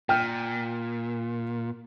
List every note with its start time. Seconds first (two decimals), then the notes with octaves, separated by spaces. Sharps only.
0.09 A#2 G5 F6